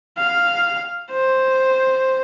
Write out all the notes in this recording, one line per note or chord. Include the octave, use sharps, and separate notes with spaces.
F5
C5